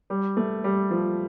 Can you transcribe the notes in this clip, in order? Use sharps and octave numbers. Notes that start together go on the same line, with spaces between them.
G3
A3
G3
F3